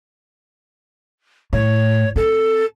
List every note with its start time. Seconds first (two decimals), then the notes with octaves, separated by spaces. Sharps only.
1.53 A2 C#5
2.16 C4 A4